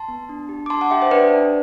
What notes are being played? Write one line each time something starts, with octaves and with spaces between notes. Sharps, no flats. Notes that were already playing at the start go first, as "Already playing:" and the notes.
Already playing: A5 C6
B3
D4
G4
D6
D4 A5 C6
F#5 A5
G4 E5 G5
C5 E5
D4 B4 D5
D4